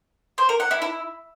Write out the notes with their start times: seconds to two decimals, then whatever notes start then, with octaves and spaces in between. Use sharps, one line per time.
0.38 C5
0.49 A#4
0.60 F#5
0.71 E4
0.82 E4